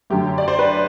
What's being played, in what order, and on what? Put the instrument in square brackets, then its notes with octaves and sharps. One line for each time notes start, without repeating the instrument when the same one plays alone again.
[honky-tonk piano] F#2 D3 F#3 A3 G4
D5
C5
B4